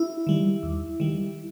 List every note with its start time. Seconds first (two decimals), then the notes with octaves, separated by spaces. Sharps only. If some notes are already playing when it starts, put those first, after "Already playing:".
Already playing: E4
0.27 D#3 G3
0.63 D#2
1.00 D#3 G3